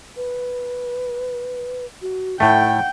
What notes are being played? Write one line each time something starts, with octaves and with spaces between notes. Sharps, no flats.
B4
F#4
A2 A3 F#5 G5